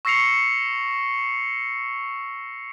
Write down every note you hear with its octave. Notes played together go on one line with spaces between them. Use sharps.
C#6 E6 A#6 C7 C#7 F7